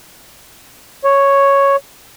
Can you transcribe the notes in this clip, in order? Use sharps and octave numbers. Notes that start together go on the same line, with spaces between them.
C#5